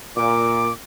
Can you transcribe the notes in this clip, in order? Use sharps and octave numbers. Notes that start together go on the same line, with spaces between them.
A#2 D6